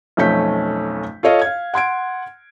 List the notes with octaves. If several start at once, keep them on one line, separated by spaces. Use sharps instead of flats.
B1 F2 A3 C#4 G6 B6
F4 A4 C#5 D#5 F5
F5 G#6
F#5 C6 G#6 D7